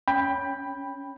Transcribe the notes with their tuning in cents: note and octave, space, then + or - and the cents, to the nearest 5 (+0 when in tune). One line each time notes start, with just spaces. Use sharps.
C#4 +0 G5 +15 B5 -5